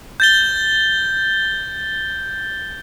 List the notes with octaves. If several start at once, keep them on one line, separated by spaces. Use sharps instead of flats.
G6 A6 G7